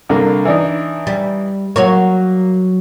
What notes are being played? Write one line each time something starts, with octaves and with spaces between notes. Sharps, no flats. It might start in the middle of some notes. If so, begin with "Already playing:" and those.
C2 D3 A#3
E3 D4 D#4
G3
F#3 A#3 F#4 C#5